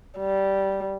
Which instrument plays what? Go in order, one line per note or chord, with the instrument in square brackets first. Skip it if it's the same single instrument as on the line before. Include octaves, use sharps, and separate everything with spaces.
[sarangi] G3